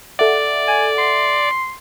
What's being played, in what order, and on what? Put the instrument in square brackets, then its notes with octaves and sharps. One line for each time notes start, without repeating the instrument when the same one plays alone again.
[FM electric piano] A4 E5 F#5 [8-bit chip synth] D5
[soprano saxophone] G#5
C6